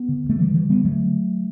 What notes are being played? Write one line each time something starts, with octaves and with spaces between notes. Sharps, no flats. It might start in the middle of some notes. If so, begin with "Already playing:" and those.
Already playing: B3
D3
D2
A3
D3 E3 G3
D3 E3 G3
D3 G3 B3
D3 F#3 A3